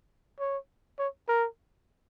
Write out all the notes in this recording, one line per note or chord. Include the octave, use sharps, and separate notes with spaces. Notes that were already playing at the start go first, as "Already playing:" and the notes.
C#5
C#5
A#4